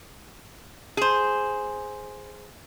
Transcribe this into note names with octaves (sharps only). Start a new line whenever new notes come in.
G#4 C5